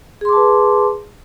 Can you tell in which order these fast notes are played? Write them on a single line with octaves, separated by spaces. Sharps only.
G#4 C6 D6 A5 B4